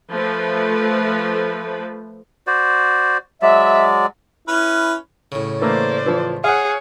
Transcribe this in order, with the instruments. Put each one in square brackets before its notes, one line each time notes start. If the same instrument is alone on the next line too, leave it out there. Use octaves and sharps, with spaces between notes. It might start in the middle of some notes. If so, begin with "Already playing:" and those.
[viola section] F3 A3 B4
[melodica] F#4 C5 D5
[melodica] F#3 G#3 D5 [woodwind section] E5
[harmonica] C#4 B4 [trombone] E4
[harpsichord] A2 C#3
[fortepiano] E3 A3 A#3 [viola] C5 D5
[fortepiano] E3 F3
[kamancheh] G#4 [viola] C#5 [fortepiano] F5 F#5